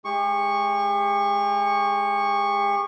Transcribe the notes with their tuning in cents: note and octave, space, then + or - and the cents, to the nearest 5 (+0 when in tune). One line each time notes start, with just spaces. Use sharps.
G#3 +25 G4 +45 C#6 +0